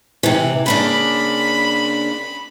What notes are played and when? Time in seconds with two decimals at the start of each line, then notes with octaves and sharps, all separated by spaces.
0.23 C3 E3
0.66 C#3 A#3 D4 B5